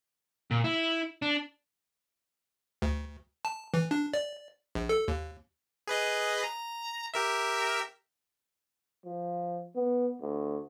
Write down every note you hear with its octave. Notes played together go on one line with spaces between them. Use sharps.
A#2
E4
D4
D2
A5
E3
D4
D5
A#1
A4
D#2
G#4 B4 D#5
A#5
G4 A#4 E5
F3
B3
D2